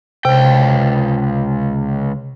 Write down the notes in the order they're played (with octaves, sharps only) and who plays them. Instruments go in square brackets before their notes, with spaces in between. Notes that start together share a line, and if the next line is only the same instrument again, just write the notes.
[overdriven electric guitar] C#2 G5 [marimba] C3